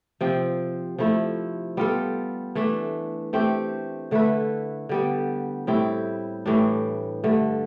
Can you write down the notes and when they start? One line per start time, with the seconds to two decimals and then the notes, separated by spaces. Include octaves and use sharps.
0.21 C3 F3 C4
0.99 F3 A3 E4
1.77 G3 B3 F4 A4
2.55 E3 A3 D4
3.33 A3 C4 G4
4.11 D3 A3 E4 B4
4.89 D3 G3 B3
5.67 A2 G3 C4 E4
6.46 A2 E3 G3 D4
7.24 G2 D3 A3